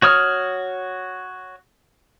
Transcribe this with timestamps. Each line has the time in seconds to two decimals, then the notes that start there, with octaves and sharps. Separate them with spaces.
0.02 F#4 C#5 D#6 F6